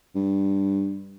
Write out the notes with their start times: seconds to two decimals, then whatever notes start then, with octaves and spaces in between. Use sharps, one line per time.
0.15 G2